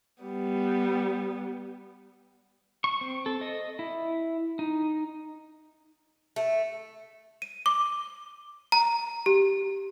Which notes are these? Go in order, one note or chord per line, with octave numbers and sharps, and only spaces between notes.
G3 B3
C#6
C4
A4
D#5
E4
D#4
A3
D#7
D6
A#5
G4